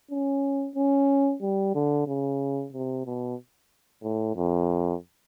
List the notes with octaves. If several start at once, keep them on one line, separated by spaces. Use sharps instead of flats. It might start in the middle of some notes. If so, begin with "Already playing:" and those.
C#4
C#4
G3
D3
C#3
C3
B2
A2
F2